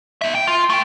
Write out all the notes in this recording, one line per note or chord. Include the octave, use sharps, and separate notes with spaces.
D#4 E5
G5
F4
A3 G5